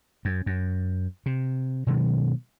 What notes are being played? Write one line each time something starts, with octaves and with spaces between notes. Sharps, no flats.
F#2
F#2
C3
B2 D#3 F#3 G#3